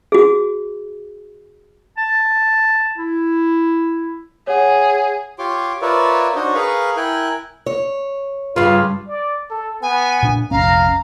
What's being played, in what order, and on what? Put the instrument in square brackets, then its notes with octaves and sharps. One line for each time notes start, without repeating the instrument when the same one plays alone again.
[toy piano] F#4 G#4
[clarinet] A5
E4
[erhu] G#4 [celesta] C#5 F#5
[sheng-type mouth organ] F4 G4 C#5 C6 D6
F4 A#4 B4 C#5 D5 E5
D4 D#4 F#4 C5 C#5 D#5
G#4 A#4 B4 F5 B5 C#6
E4 A#4 G5 G#5 F#6
[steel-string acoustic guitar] C#5
[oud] G2 C#3 [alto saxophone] F4 [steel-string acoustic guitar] B4
[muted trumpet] D5
A4
[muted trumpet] B3 [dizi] G#5
[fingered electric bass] A#2 D4
[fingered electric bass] F1 A#1 C#4 [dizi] F5 [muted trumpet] A#5